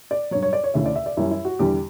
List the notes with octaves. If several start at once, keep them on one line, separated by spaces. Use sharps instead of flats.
D5
G2 F#3 C#5
C#5
D5
C#5
D2 C#3 E3 E5
D5
E5
D5
F#2 E3 G3 E4
E4
F#4
E2 D3 G3 G4